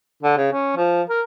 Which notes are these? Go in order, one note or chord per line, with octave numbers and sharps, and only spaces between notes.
D3
C#3
C#4
F3
A#4